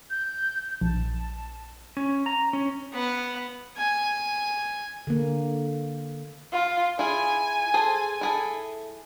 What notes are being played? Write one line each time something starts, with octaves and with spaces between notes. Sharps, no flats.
G6
A#1 A5
C#4
A#5
C#4
B3
G#5
D3 A#3
F4
E4 F4 G#4 G#5
G#4 A4 C5
E4 G#4 A4